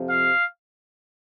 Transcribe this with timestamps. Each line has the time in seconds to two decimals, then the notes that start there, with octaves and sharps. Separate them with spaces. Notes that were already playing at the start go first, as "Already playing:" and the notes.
Already playing: F2 C3 F3
0.08 F5